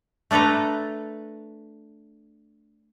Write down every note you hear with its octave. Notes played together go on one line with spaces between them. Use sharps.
A3 D4 A4 B4 A#5